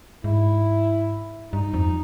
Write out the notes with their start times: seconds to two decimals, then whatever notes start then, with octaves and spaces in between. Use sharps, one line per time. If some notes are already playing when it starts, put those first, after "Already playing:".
0.24 G#2 E4
1.52 G2 D#4
1.74 F2